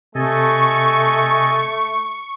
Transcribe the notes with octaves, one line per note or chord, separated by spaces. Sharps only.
C3 A3 A4 D#5 G#5 C#6